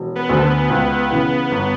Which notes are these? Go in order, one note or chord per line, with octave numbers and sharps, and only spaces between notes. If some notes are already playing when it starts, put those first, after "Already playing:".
Already playing: E1
B3
D2 D3
A3
B3
C#2
C#3 E3
G1